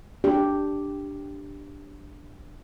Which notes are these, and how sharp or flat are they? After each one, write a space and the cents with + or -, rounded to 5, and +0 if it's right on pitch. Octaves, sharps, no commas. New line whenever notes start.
D4 +0 G4 +0